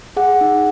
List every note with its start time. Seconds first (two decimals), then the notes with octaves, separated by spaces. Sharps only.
0.17 G#4 F#5
0.41 D#4